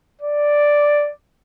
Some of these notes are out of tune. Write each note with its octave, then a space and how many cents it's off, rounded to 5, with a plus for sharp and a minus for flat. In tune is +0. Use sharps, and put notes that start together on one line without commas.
D5 +0